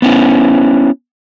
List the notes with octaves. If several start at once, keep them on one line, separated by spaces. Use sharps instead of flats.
B3 C#4 E4